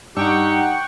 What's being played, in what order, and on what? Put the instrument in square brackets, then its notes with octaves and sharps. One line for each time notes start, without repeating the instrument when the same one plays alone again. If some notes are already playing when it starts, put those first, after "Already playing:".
[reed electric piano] G2 D4 E6 [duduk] D#4 [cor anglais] G4 [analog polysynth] F#5 G5 C#6